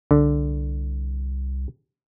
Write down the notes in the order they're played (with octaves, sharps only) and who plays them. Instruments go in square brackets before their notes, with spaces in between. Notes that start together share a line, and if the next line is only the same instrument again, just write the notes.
[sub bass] C2 [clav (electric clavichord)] D3